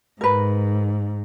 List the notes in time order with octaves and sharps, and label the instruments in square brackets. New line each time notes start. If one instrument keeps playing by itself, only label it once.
[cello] G#2 [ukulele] A#4 B4